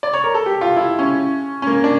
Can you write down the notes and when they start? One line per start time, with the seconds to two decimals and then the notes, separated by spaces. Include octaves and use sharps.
0.03 D5
0.13 C#5
0.24 A#4
0.34 A4
0.46 G4
0.61 F4
0.76 E4
0.99 C#4
1.62 C#4
1.67 A#3
1.84 D4